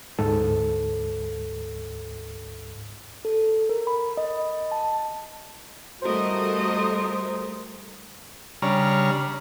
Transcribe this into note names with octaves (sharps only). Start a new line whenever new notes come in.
D2 G#2 A4
A4
A#4
B5
D#5
A5
G3 A3 F#4 A#4 C5 D#5
C#3 G3 D4 C#5 A#5 F6